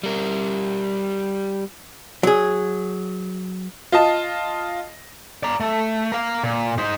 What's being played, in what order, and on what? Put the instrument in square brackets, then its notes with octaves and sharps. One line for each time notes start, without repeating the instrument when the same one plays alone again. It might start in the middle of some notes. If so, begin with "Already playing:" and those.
[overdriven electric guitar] G3 A#4
[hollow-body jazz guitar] F#3 G#4
[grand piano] F4 D#5 A5
[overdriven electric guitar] D5 A#5
A3
A#4 F5
A#2
D#4 C5